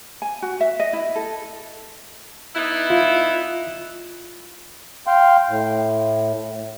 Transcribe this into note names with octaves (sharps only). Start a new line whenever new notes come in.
G#5
F#4
E5
D#5
E4
A4
B3 D#4 E4
F4
F5 G5 C6
A2